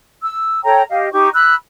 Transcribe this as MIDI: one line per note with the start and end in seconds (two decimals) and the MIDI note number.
0.22 0.62 88
0.64 0.83 69
0.64 0.83 73
0.64 0.83 79
0.64 0.83 82
0.89 1.09 67
0.89 1.09 75
0.89 1.09 77
1.12 1.29 63
1.12 1.29 67
1.12 1.29 85
1.12 1.29 86
1.34 1.54 83
1.34 1.54 88
1.34 1.54 90